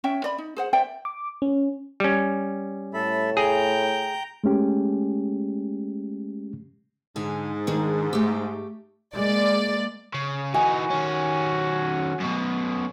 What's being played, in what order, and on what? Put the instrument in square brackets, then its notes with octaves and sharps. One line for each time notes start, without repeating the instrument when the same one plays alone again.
[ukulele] C#4 C#5 E5 G5
D5 B5
D#4
G#4 C5 F#5
C5 D5 E5 G5
[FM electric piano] D6
C#4
[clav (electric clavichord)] G3 C#4
[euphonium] A2 [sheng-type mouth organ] A4 E5 B5
[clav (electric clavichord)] G#4 [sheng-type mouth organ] G5 A#5 G6
[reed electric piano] G#3 A3 C#4 G4
[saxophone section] G#2 [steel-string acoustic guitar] D3 G#5
[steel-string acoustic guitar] D#3 D4 G#4
A3 G4
[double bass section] G#3 A#3 [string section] D5
[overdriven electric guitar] C#3
[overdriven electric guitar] E3 D#4 [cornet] F#4 [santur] G#5
[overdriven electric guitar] D#3 C#4
F#2 B2